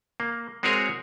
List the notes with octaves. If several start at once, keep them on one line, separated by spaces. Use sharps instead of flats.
A#3
G#3 C4 F#4 G#4 A#4 C#5